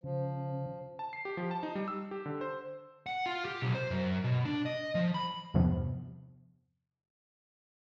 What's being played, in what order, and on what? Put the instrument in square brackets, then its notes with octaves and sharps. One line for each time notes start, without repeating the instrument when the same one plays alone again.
[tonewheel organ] C#3 [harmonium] F3
[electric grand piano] A5
C7
G4
F3
A5
D#4
G3
E6
G4
D3
C5
[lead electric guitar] F#5
F4
G4
B1
C5
F#2
B2
D4
D#5
F3
B5
[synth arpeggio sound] E2 G2 C3 F3 B3